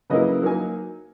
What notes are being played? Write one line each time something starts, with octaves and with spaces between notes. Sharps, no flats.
C#3 F#3 A#3 E4 B4 D#5
F#3 A#3 D#4 G#5